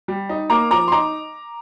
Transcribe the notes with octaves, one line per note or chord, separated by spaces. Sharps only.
G3
D#4
A#3 A#5 D6
F3 A#5 D6
C6
D#4 A#5 D6